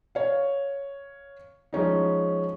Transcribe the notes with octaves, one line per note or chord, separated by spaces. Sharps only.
C#5 F5
F3 G#3 C#4 D#4